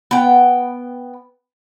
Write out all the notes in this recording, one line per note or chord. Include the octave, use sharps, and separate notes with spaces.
B3 G5